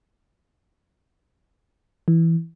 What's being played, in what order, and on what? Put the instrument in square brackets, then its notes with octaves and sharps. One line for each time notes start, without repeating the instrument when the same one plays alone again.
[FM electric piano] E3